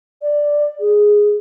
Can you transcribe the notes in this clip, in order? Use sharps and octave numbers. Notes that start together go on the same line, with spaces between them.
D5
G#4